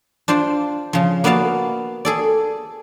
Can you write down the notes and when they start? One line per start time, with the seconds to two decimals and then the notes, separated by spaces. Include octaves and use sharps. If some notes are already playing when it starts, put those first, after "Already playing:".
0.28 D4 F4 C5 D5
0.93 C#3 F3
1.24 A#3 B3 F#4 D5 F5 A5
2.05 G#4 A4 D5